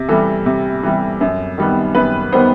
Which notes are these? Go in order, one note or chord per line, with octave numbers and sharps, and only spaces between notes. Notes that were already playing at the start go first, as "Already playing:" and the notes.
Already playing: C3
E3 G3 A4
C3
E3 G3
F#2
D#3 G3 B3
F#2 B4
D#3 G3 B3 C5